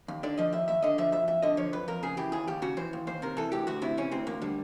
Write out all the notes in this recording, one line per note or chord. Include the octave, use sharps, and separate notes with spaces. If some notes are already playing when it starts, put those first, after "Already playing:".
D#2
D3 D5
F3 D#5
D#2 E5
D#2 E5
D3 D#5
F3 E5
F2 E5
F2 E5
D3 D#5
F3 C#5
F2 B4
F2 A#4
C#3 G#4
E3 G4
D#2 G#4
D#2 G4
C#3 F#4
E3 C5
D#2
D#2 C5
C3 A#4
E3 A4
D2 G4
D2 F#4
C3 E4
E3 C#4
D2 C4
D2 A#3
D3 G3